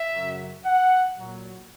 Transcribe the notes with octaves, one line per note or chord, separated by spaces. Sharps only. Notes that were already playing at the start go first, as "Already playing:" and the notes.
Already playing: E5
F#2 C#3 F#3
F#5
A#2 F#3